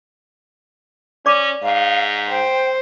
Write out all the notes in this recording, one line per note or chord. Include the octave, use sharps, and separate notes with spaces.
C#4 D5 D6
G#2 F5
C5 G5